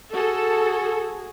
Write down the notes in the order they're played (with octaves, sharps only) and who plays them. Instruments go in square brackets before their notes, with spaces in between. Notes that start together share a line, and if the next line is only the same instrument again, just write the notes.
[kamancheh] F#4 G#4 [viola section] A4